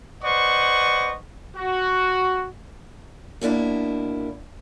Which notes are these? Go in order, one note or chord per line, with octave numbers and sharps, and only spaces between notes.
B4 C5 D5 D#5 F#5 C#6
F#4
B2 A#3 D4 E4